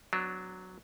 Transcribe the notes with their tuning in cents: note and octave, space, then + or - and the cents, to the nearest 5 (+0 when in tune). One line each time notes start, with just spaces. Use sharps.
F#3 +0 B3 +40 D4 +0